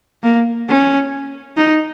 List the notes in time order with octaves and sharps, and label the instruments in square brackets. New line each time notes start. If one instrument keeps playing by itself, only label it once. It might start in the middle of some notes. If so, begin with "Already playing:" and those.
[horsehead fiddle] A#3
C#4
D#4